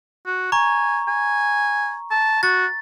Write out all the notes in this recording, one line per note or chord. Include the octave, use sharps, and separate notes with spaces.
F#4
G#5 A#5 C#6
G#5
A5
F#4 A6